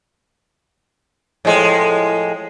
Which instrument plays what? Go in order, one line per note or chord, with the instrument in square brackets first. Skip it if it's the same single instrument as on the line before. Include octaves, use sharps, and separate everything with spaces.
[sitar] A2 F3 G#3